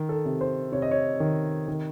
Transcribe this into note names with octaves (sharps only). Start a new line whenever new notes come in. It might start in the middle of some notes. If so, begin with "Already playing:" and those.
Already playing: D#3
A4
C3
C5
C3 C#5
D#5
C#5
D#3
D#3